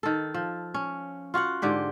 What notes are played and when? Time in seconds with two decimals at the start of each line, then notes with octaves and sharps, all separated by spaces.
0.03 D#3 A4
0.34 F3
0.74 C#4
1.34 F4 F#4 F5 F#5
1.62 G#2 D3 G4 G5